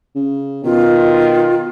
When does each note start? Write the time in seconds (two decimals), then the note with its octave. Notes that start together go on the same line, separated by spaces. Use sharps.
0.15 C#3
0.64 B2 D#3 F4